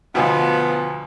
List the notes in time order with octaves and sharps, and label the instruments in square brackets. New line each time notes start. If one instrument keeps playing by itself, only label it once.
[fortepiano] D2 B2 [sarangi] F3 [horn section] B3